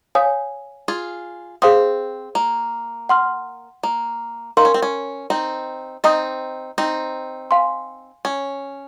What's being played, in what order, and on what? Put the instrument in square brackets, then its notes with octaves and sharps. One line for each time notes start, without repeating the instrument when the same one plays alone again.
[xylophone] C#5 F5 G#5 D#6
[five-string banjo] F4 G#4
[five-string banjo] C4 [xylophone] G#4 C5 F5 C6 D#6
[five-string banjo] A#3
[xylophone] F#5 C6 F6
[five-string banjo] A#3
[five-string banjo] D#4 [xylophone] A#4 F5 C6
[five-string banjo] C#4
C4
C#4
C4 D#4
[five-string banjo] C4 D#4 [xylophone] D#5 A#5 D#6
[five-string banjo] C4 D#4
[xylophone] F5 G#5 C6
[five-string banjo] C#4